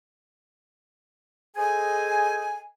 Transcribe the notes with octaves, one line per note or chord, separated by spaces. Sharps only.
G#4 A4 C5 D#5 G#5